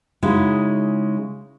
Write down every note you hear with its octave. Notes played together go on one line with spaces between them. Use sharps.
C#3 G#3 D#4 E4 F#4